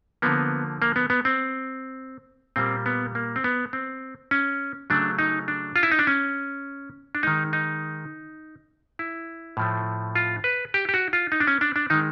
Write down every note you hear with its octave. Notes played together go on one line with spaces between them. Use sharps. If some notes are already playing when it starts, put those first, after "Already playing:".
D3 F3 A#3 B3
A#3
B3
B3
C4
A#2 G3 A#3 C4
B3
A#3
C4
B3
C4
C#4
C#3 F#3 A3 D4
D#4
D4
F4
E4
D#4
D4
C#4
D4
D#3 G#3 D#4
D#4
E4
A2 F3 A3
F4
B4
G4
G4
F#4
F4
D#4
D4
C#4
D4
D4
D#3 G#3 D#4